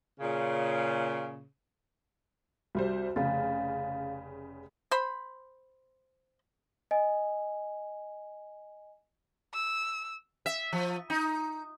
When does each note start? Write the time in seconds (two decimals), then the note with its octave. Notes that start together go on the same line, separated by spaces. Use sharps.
0.19 A#2 C#3
2.75 C2 G3 F#4 C5
3.16 F1 C#3 F5 A6
4.91 C5 B5
6.91 D#5 G#5
9.54 E6
10.46 E5
10.73 F3
11.10 D#4